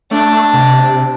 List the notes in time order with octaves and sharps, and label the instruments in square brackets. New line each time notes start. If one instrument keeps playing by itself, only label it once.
[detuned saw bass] A3 [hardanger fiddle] D4
[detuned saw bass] C3